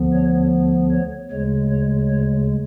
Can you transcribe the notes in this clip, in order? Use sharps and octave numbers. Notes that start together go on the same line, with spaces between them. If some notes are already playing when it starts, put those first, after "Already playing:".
Already playing: D2 D3 F3 B3
C#5
C#5
D2 C#3 G#3 C#5
C#5
C#5